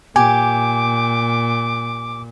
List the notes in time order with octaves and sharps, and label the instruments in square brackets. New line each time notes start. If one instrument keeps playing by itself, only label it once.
[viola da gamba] A#2 [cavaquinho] G4 [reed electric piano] G#5 [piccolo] D6